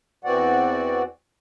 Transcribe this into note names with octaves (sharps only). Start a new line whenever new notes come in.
E2 E3 C4 F#4 D5 F#5